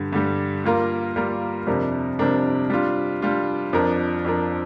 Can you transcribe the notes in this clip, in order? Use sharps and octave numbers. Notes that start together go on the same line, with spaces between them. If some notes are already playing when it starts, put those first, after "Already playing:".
Already playing: G2 D3 G3
G2 D3 G3
G3 A#3 F4 A#4
G3 A#3 F4 A#4
F2 C3 G3 D4 A#4
F2 C3 G3 D4 A#4
G3 D4 F4
G3 D4 F4
F2 F3 D4 A#4
F2 F3 D4 A#4